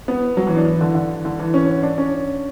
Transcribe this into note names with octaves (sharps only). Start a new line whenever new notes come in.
B3
F#3
E3
D4
E3
D3
D3
D3
E3
C#4
D4
C#4